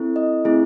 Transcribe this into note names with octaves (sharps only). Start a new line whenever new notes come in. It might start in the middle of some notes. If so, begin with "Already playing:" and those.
Already playing: C4 E4 A4
D#5
A3 C4 E4 G#4